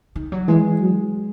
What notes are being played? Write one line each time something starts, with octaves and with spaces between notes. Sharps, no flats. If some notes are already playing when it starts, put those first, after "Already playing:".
D#3
F#3
E3 G#3
F#3